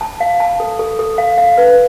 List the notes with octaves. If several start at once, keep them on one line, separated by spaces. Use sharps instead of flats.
A5
F5
A5
A4
A4
A4
F5
F5
B4